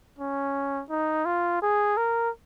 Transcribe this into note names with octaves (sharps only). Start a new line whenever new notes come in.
C#4
D#4
F4
G#4
A#4